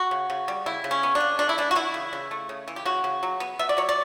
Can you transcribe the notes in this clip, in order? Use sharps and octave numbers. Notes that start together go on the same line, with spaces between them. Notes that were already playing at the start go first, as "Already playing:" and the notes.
Already playing: F#4
C#3
C#3
G3
C#3 E4
C#3
C#4
B3
D4
C#3
A3 D4
E4
E3 D4
F#4
E3 E4
C#3
C#3
A3
C#3
E3
G4
C#3 F#4
C#3
F#3
B3
B3 E5
D5
F#3 C#5
D5